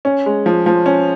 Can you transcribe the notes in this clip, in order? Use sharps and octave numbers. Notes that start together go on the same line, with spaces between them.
C#4
G#3
F3
F3
C#4